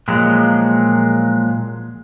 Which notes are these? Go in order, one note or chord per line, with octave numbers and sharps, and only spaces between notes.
A#2 F3 F#3 G#3